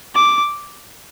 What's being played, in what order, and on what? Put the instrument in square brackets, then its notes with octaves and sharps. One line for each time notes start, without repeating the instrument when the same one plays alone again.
[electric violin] D6